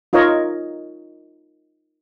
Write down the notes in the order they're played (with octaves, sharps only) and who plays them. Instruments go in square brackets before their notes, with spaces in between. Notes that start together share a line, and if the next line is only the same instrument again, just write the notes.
[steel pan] D#4 F4 A#4 C#5 D#5